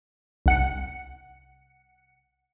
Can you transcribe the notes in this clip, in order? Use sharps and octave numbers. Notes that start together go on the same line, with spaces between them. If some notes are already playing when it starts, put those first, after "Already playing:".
C2 F#5 C#7